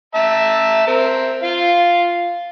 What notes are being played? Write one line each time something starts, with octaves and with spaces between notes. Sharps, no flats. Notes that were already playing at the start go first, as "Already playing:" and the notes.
E5 A5 A#5
C4 A#4
F4 F5